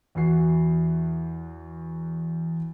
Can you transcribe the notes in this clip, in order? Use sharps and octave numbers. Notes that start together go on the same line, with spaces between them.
E2 E3 E4 F#4 C7